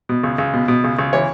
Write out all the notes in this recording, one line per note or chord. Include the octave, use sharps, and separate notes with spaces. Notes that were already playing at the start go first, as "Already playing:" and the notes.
B2
C#2
C#2
B2
B2
C#2
C#2
E3 C#5